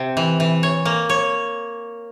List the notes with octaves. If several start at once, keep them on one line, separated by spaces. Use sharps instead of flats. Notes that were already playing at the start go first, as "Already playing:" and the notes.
Already playing: C3
E3
E3
C#5
A#3
C#5